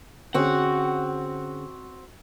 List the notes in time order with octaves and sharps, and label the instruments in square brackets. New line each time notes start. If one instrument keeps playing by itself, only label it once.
[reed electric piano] D3 C#4 G#4 [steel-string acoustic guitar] C4 F#4 [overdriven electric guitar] F#5